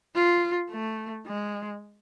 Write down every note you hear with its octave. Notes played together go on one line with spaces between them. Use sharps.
F4
A3
G#3